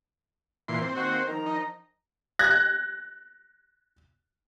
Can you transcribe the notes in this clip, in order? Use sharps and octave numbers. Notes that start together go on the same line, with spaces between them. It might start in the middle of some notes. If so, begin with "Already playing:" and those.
A#2 E3 C6
C4
D#3 A#3 F#4
D#3 F3 A#5
D#4
F#6 G#6 A#6